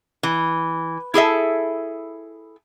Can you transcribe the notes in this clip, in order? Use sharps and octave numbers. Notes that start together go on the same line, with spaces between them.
E3
E4 G#4 A4 E5